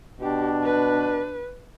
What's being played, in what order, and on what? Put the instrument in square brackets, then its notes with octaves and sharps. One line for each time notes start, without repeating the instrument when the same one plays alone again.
[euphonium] B2 [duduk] D4 [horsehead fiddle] G4
[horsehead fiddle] B4